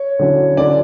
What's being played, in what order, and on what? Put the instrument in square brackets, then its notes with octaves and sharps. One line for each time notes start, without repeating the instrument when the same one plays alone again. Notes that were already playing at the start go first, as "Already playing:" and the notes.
Already playing: [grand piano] C#5
D3 F#3 C#4 E4
D3 F#3 C#4 E4 D5